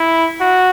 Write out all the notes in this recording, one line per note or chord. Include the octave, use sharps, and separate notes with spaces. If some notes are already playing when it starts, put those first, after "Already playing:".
Already playing: E4
F#4